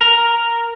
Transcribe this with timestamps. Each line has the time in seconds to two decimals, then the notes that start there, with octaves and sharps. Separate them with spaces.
0.01 A#4